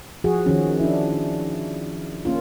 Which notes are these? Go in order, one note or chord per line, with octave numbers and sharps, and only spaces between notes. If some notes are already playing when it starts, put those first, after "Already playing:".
F3 F#4 G#4
D#3 F3 C#4
D4 E4
A#3 C#4 F4